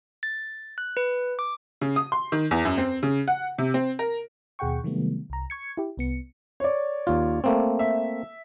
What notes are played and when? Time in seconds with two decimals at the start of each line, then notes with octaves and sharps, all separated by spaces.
0.23 A6
0.78 F#6
0.97 B4
1.39 D6
1.81 C#3
1.96 D#6
2.12 C6
2.32 D#3
2.51 E2
2.65 F#2
2.78 C4
3.03 C#3
3.28 F#5
3.58 C3
3.74 C4
3.99 A#4
4.59 D#2 B2 G#4 F#5 G5 C#6
4.84 C3 D#3 F#3 G3 A3 B3
5.30 C2 A#5
5.50 C#6 G#6 C#7
5.77 E4 G4
5.97 C2 B3 C#7
6.60 C#5 D5
7.07 D#2 F4
7.44 A3 A#3 C4
7.79 E5